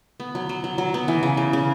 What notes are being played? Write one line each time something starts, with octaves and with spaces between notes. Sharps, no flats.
B3
F#3
F#3
F#3
F#3
B3
E3
C#3
C#3
C#3